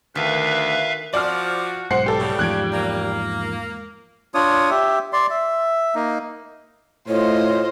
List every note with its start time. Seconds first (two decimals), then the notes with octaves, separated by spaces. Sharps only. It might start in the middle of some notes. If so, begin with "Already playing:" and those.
0.15 D2 D#3 A4 B4 E5 F5
1.14 F3 F#4 D5 F6
1.91 B1 G#2 C5 F#5 C7
2.06 G3 G4 A4
2.20 A2 C#3
2.39 E2 G#2 F3 F#6 G#6 D7
2.73 A#3
4.34 D4 F4 C#5 D#6
4.70 G4 E5
5.13 D5 C6
5.30 E5
5.95 A#3 D#4
7.08 A2 F4 C5 C#5 D#5